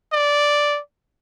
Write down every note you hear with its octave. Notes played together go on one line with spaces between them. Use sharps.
D5